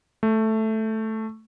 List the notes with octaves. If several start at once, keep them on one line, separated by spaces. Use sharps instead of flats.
A3